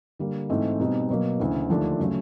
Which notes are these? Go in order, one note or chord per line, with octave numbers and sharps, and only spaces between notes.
D3 G3 A#3
G#2 E3 A3 C4
B2 G3 C4 D#4
B2 F#3 A#3
D2 C#3 E3
D#2 D3 F3 A3 D4
C#3 F#3 A3